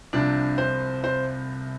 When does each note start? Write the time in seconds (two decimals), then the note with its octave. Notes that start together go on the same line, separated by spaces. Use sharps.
0.13 C2 C3 F3 D4
0.58 C5
1.04 C5